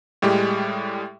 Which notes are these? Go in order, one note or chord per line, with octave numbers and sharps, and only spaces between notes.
A2 G3 G#3 G4